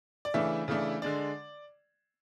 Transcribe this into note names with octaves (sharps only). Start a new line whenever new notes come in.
D5
C#3 E3 A3 D4 E5
C#3 E3 A3 D4
D3 G#3 D4 D5